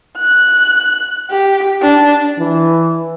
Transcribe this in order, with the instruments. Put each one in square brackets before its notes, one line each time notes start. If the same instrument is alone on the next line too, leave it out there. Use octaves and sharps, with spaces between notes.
[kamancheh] F#6
G4
D4
[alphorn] E3